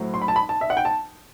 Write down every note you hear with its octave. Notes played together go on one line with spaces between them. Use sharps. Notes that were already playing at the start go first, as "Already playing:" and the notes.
Already playing: A2 F#3 C4 E4
C6
B5
A5
B5
A5
E5
F#5
G5
A5